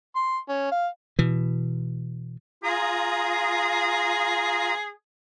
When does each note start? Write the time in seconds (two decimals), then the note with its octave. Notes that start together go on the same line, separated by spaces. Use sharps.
0.16 C6
0.49 C#4
0.72 F5
1.19 B2 E3
2.64 F4 G#4 A#5 D#6